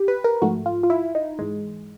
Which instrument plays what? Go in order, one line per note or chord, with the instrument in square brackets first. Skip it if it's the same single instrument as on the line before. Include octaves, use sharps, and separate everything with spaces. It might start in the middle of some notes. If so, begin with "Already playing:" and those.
Already playing: [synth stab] G4
B4
A#4
G#2 F3 A3 F#4
F4
F4
E4
D#4
G#2 E3 G#3